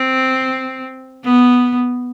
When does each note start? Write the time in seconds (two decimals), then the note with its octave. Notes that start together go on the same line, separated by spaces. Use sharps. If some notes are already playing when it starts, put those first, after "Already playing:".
Already playing: C4
1.24 B3